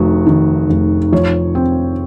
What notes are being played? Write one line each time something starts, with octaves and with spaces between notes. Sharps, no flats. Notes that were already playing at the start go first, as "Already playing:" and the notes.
Already playing: F1 D#3 F#4
D#3
F1
F3 C#5
C4